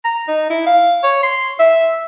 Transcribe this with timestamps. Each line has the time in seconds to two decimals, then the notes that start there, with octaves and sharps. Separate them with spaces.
0.05 A#5
0.28 D#4
0.50 E4
0.66 F5
1.04 C#5
1.23 C6
1.59 E5